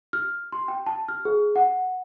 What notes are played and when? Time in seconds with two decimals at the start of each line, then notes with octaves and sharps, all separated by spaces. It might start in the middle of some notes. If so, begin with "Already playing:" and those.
0.13 F6
0.52 C6
0.68 G5
0.86 A5
1.08 F6
1.25 G#4
1.56 F#5